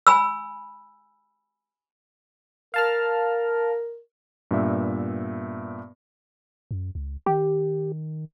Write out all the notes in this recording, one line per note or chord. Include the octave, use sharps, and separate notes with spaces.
G#5 B5 E6
A#4 F5 A5 F6
G2 A#2 B3 E5
F#2
C#2
D#3 G4